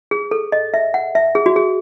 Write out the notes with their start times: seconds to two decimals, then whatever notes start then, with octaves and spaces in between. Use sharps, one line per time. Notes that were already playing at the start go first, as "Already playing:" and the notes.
0.11 G#4
0.31 A4
0.52 D#5
0.74 E5
0.94 F#5
1.15 E5
1.35 G#4
1.46 F#4
1.56 G#4